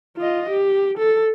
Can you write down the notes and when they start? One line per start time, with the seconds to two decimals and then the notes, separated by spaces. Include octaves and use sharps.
0.17 F4 D#5
0.50 G4
0.98 A4